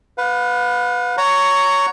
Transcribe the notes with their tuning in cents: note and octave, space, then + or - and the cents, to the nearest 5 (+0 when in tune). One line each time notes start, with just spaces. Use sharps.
B4 +10 F5 +45
C#5 +10 F#5 +0 A#5 -15